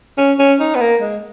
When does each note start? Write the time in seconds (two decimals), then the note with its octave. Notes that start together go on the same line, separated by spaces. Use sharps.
0.17 C#4
0.39 C#4
0.60 D#4
0.75 B3
0.80 A#3
1.01 G#3